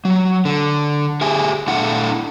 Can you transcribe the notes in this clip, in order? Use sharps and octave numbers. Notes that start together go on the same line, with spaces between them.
F#3
D3
G4 G#4 E5 G#5
A3 D4 E4 F#5